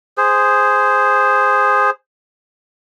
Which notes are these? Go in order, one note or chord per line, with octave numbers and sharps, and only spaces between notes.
G#4 C5